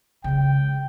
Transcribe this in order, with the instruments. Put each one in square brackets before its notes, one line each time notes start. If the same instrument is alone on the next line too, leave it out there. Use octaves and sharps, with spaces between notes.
[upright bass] C#3 G#3 [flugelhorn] G5